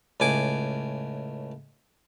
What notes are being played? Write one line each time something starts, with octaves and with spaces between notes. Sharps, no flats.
C#2 A2 G#5 D6